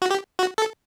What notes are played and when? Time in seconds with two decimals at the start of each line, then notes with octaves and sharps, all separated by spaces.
0.02 F#4
0.10 G4
0.39 F#4
0.58 A4